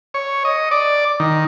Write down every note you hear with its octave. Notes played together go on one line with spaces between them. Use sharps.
C#5
D#5
D5
D#3